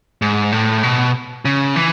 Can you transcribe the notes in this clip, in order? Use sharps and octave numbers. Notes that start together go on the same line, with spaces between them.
G#2
A2
B2
C#3
E3